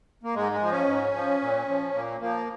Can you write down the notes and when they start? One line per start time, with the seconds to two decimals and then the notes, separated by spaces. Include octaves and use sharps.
0.24 A#3
0.35 G#2 G#3
0.52 G#3
0.61 F3
0.71 C#4
0.87 G#2
1.14 F3
1.42 A#2
1.68 F3
1.94 A#2 A#3
2.20 F3 A#3